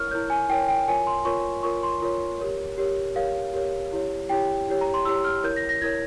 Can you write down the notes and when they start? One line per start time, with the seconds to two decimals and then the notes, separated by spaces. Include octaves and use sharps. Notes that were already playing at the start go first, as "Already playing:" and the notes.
Already playing: E4 A#4 C#5 C#6 F6
0.11 E4 A#4 C#5 G6
0.30 G#5
0.49 E4 A#4 C#5 G5
0.68 G5
0.88 F4 A#4 C#5 G#5
1.07 C6
1.25 F4 A#4 C#5 C#6
1.63 F4 A#4 C#5 C#6
1.83 C6
2.02 F4 A#4 C#5
2.40 G4 A#4 C#5
2.78 G4 A#4 C#5
3.15 G4 A#4 C#5 F5
3.54 G4 A#4 C#5
3.92 E4 G4 C#5
4.29 E4 G4 C#5 G5
4.68 E4 G4 C#5
4.81 A#5
4.94 C6
5.05 E4 G4 C#5 E6
5.24 F6
5.44 E4 A#4 C#5 G6
5.56 A#6
5.69 A#6
5.82 E4 A#4 C#5 G#6